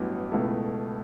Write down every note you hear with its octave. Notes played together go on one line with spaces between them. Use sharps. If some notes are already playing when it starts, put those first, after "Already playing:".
Already playing: A1 G2 F#3 B3 E4
C#2 B2 A3 E4 A4